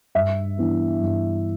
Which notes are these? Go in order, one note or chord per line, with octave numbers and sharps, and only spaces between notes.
G2 E5
E3 B3 D4
G2